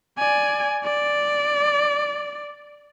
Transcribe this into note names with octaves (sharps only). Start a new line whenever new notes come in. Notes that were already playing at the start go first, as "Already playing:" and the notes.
D5 G#5
D5